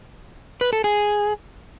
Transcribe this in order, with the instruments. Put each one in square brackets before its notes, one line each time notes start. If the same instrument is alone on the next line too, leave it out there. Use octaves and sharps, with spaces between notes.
[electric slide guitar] B4
A4
G#4